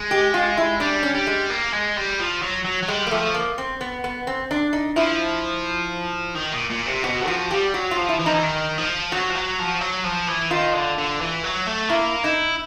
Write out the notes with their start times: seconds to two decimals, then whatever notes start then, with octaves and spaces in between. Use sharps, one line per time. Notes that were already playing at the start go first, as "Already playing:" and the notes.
Already playing: G#3
0.11 G4
0.34 F4
0.57 E4
0.80 G3 D4
1.03 C#4
1.15 G3
1.27 G#3
1.50 A#3
1.72 G#3
1.96 G3
2.19 F3
2.42 F#3
2.65 F#3
2.83 F#3
2.88 G3 G#3
3.07 A#3
3.11 F3 A3
3.34 A#3
3.58 C4
3.81 B3
4.04 B3
4.27 C4
4.51 D4
4.73 D#4
4.96 F3 E4
6.35 D#3
6.52 A#2
6.70 A#2
6.86 C3
7.04 B2 F#4
7.28 F3 F#4
7.50 G3 G4
7.74 F#3 F#4
7.91 F4
7.97 F3
8.09 E4
8.19 E3
8.26 F3 D#4
8.34 E3
8.43 D#3
8.78 F3
9.12 F#3 F#4
9.30 F3
9.35 F#3
9.59 F3
9.81 F#3
10.04 F3
10.28 E3
10.51 D#3 F4
10.73 D3
10.98 D3
11.20 E3
11.44 F#3
11.67 A3
11.89 A#3 E4
12.24 D#4 E4